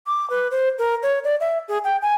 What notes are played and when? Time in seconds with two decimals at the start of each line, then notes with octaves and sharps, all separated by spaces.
0.07 D6
0.30 B4
0.51 C5
0.78 A#4
1.03 C#5
1.24 D5
1.40 E5
1.68 G#4
1.84 G5
2.02 G#5